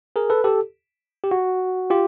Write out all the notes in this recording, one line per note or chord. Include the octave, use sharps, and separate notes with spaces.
G#4 A#4
A4 B4
G4 A4
G4
F#4
F4 G4